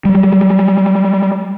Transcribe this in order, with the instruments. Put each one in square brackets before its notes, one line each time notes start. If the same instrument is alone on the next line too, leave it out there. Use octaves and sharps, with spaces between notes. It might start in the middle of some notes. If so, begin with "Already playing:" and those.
[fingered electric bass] F#3 G3